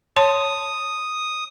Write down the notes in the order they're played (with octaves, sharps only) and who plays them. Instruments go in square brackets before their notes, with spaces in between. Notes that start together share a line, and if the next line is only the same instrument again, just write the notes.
[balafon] C#5 A5 C6 [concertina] D#6